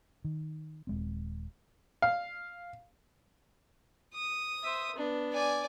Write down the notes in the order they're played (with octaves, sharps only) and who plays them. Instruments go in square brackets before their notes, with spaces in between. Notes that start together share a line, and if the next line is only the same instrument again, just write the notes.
[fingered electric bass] D#3
D#1 G#3 C4
[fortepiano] F5
[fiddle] D#6
[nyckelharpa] C5 E5
B3 D4
[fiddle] D5 G#5